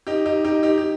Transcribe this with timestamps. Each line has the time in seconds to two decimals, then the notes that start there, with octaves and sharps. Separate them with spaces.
0.07 D#4 G4
0.26 D#4 G4
0.44 D#4 G4
0.63 D#4 G4
0.78 G4